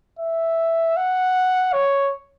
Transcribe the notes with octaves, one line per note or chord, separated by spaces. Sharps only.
E5
F#5
C#5